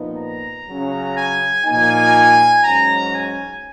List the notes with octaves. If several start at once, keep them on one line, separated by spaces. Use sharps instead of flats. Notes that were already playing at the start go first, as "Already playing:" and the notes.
Already playing: A#2 F3 B3 D#4
A#5
C#3 F#3 C#4
G#5
A#2 F3 A#3 D#4 G#5
G#2 F#3 C#4 A#5
G#5